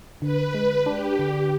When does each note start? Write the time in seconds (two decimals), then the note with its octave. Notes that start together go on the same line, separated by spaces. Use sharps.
0.22 D3 B4
0.54 G#3
0.86 D4 G4
1.19 D3